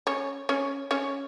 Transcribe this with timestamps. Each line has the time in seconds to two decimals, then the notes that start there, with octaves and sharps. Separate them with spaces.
0.07 C#4 C#5
0.49 C#4 C#5
0.91 C#4 C#5